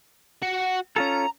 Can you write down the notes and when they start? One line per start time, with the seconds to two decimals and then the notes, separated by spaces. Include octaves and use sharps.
0.42 F#4 F#5
0.96 C#4 F4 A4 A#5